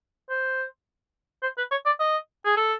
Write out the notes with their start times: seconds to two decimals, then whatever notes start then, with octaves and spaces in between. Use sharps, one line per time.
0.30 C5
1.43 C5
1.58 B4
1.71 C#5
1.86 D5
2.00 D#5
2.45 G#4
2.57 A4